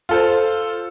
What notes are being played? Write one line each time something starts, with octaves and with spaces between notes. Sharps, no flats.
F4 A4 C5